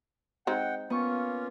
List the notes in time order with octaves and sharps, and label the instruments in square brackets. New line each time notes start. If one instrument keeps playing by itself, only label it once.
[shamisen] G#3 C4 D#4 [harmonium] F#5 G5
[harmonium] A#3 C#4 F4 [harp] B3 C#6